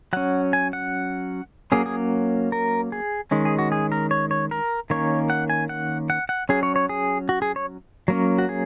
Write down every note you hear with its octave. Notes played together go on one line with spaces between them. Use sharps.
F#3 C#4 F#5
G#5
F#5
F#3 A#3 C#4 G#4
G#4
A#4
G#4
D#3 G#3 C#4
G#4
F#4
G#4
A#4
C#5
C#5
A#4
D#3 A#3 C#4 C#5
F#5
G#5
F#5
F#5
F#5
F#3 C#4 G#4
C#5
C#5
G#4
F#4
G#4
C#5
F#3 A#3 C#4
F#4
G#4